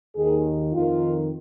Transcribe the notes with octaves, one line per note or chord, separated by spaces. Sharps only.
D#2 D#3 G#4
F2 D#3 F4